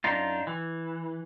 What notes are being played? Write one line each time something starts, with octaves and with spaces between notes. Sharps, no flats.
F#2 D4 D#4 F4
E3